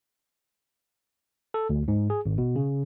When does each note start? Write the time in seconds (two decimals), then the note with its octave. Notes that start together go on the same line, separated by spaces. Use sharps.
1.54 A4
1.70 D2
1.88 G#2
2.10 G#4
2.26 G#1
2.38 B2
2.56 C#3